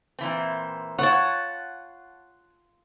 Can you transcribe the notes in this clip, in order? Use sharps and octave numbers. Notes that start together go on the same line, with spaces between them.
A#2 E3 C4
F4 C#5 F#5 A5